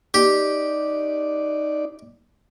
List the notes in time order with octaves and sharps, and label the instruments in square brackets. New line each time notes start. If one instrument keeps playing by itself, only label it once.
[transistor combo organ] D#4 D5 [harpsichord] G4